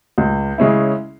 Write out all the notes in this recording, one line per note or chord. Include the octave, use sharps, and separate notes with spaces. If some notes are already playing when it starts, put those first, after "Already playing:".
C#2
C#3 G#3 C#4 E4